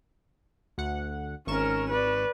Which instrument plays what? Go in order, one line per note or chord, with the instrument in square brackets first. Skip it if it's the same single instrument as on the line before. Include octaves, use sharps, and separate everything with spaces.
[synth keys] D2 F#5
[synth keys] G#1 C#6 E7 [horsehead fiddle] C#4 A#4
[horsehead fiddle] B4 D5